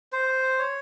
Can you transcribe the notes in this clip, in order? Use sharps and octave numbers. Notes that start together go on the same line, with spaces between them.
C5
C#5